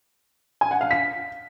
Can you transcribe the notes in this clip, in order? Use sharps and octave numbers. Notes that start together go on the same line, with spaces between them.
G#5
F#5
F5
B6